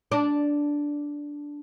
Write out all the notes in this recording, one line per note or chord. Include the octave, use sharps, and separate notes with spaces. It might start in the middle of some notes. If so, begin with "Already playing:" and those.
D4